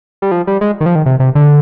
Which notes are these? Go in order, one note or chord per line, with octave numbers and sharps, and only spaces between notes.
G3
F3
G3
G#3
D#3
F3
D#3
C3
C3
D3